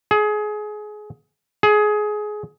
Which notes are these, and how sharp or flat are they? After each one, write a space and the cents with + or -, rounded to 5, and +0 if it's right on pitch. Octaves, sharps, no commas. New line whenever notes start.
G#4 +25
G#4 +20